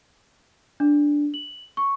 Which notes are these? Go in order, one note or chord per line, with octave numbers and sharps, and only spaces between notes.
D4
F#7
C#6